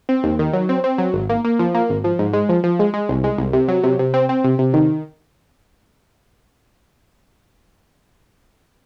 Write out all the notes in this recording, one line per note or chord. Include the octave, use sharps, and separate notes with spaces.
C4
D#2
D#3
F#3
C4
C4
F#3
G#1
A#3
A#3
F3
A#3
G#1
F3
G#2
G#3
F3
F3
G#3
G#3
C2
G#3
C2
C3
F#3
C3
C3
C4
C4
C3
C3
D#3